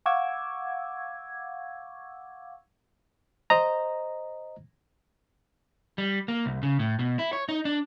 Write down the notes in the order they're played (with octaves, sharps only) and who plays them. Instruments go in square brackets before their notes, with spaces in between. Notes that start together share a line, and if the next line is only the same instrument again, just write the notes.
[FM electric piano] F5 F#5 C#6 D6 E6 G#6
[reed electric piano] C5 D#5 A#5
[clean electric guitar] G3
A#3
C2
C#3
A2
B2
E4
C#5
D#4
D4